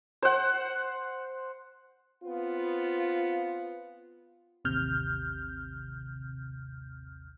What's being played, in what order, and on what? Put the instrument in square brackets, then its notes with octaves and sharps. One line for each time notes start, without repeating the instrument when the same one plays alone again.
[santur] C5 F#5
[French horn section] B3 C4 F4
[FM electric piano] A1 D#2 C3 F6 G6